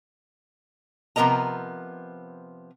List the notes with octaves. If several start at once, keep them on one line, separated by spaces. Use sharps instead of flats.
C3 F3 B3 A#4 D#5 A#5